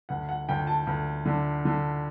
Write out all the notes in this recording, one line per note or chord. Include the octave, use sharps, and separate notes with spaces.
D2 F#5
F#5
D2 G5
A5
D2
D3
D3